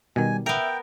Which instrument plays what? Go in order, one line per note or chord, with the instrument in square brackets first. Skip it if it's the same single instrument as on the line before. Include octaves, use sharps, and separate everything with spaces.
[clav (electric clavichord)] B2 D#3 [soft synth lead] G3 [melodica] G#5
[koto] B3 A#4 [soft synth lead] E5 [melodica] G5